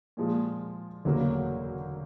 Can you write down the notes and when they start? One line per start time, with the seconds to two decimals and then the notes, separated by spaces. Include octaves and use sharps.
0.17 A#2 F3 G#3
1.04 E1 D2 C#3 F#3 A#3